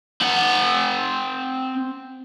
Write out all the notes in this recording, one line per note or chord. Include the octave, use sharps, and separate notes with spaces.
C4 F#5